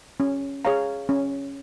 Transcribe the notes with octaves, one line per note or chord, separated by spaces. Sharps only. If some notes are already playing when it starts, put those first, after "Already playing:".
C#4
G#4 C#5 F5 A#5
C#4